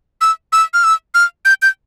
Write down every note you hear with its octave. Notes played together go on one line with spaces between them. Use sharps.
E6
E6
F6
E6
F6
G6
G6